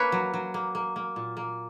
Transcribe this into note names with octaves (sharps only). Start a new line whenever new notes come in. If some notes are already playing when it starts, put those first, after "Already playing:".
Already playing: A#3 C#4 B4 C#5
F#3
F#3
A#3
A#3
A#3
A#2
A#3